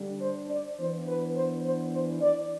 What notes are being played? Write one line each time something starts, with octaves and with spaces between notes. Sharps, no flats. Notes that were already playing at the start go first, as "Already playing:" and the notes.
Already playing: D3 G3 D4
C5
D5
E3 B3 D4 C5
B4
C5
C5
C5
D5